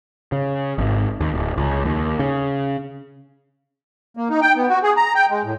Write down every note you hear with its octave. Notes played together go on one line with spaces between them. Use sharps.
C#3
G#1
D#2
D1
C#2
D#2
C#3
A#3
D#4
G5
B3
F#4
G#4
A#5
G5
G#3
A2